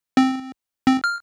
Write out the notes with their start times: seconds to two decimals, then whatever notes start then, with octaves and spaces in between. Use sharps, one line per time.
0.17 C4
0.87 C4
1.04 F6